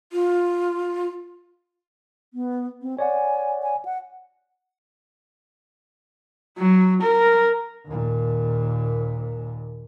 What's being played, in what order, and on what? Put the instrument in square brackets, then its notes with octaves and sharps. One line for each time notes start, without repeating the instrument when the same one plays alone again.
[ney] F4
[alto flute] B3
C4
[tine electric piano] C#5 D5 F#5 [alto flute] G#5
[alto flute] G#5
F#5
[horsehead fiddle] F#3
A#4
[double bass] D#2 A#2